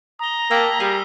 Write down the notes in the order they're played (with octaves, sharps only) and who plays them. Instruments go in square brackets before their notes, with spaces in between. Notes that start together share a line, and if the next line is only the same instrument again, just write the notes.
[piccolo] A#5 [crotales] D#6 G7
[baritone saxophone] A#3 [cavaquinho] G4 A5 [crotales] E6 B6 F#7
[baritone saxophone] G3 [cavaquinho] G#4 [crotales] C7 D#7